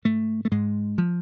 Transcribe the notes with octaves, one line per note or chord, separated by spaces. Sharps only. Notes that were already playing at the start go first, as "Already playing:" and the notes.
G#2 A3
A3
G#2 G#3
F3